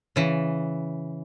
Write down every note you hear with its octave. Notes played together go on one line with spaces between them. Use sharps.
C#3 E3